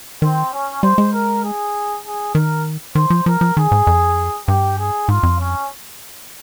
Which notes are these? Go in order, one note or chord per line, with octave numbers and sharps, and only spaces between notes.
D#3 C4
C#4
G3 C5
G#3
A#4
G#4
G#4
D#3 A#4
D#3 C5
F3
F3 A#4
F3
D#3 G#4
G#2
F2
G2 G4
G#4
G#2 F4
F2
C#4